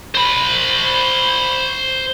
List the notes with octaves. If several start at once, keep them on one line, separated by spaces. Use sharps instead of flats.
C5 B5